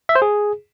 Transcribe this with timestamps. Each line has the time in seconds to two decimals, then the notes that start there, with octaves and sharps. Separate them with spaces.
0.09 E5
0.15 C5
0.22 G#4